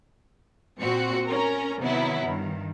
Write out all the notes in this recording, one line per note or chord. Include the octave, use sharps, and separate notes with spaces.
A#2 C4 F#4 C#7
C#4 A#4 A#5
C3 D#3 F#3 B3 E4
G2 D#3